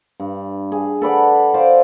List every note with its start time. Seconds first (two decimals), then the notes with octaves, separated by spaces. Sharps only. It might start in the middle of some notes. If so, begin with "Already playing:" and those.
0.20 G2
0.72 G#4
1.02 A4 B4 D5 F#5
1.54 C5 D5 F5 D6